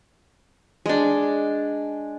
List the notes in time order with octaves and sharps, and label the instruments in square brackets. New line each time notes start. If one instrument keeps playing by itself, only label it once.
[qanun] G#3 D4